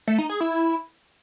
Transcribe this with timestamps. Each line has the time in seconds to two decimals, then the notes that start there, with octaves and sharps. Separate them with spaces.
0.07 A3
0.18 D#4
0.29 G#4
0.40 E4